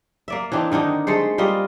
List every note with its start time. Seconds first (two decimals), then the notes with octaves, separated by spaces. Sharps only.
0.28 A#3 D5 E5
0.52 E3 C4 D4 D#4
0.72 D3 D#3 D4 D#4
1.07 G#3 A3 A4 C5
1.38 G3 A#3 F4 D#5